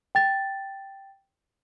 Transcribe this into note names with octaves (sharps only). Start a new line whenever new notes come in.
G5 A6